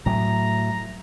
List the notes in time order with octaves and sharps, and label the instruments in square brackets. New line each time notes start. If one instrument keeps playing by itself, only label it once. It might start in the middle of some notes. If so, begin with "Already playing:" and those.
[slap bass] A2 F#3 [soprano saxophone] A#5